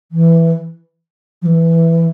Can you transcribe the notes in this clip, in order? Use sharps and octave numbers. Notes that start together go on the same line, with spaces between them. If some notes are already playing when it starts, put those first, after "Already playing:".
E3
F3
E3